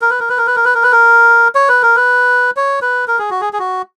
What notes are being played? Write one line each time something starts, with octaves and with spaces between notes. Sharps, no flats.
A#4
B4
A#4
B4
A#4
B4
A#4
B4
A#4
B4
A#4
C#5
B4
A#4
B4
C#5
B4
A#4
G#4
F#4
G#4
G#4
F#4